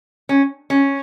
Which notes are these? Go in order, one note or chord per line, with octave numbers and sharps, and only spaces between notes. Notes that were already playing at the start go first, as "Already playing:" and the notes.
C#4
C#4